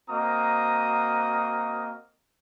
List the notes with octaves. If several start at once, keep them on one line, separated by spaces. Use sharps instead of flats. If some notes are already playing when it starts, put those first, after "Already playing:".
A#3 C4 F#4 D#5 A#5 D#6